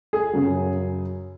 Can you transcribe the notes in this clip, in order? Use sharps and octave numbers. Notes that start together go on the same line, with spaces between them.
G#4
F#2 C#3 F#3